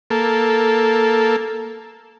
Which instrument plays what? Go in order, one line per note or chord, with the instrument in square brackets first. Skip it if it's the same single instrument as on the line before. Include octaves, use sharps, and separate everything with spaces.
[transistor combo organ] A#3 A4